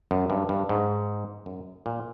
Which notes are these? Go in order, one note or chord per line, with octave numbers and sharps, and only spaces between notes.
F#2
G2
G2
G#2
F#2
A#2